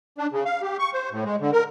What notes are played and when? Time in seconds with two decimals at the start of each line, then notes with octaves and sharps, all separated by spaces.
0.18 D4
0.32 C#3
0.45 F5
0.62 G4
0.79 C#6
0.94 C5
1.11 A2
1.25 G#3
1.40 D3
1.52 A#4